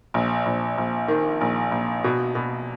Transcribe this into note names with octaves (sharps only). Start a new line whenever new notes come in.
A#1
A#1
A#1
D#3
A#1
A#1
B2
B2